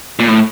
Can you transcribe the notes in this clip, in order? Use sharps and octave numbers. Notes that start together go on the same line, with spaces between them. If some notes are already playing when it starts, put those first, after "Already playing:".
A#2
A2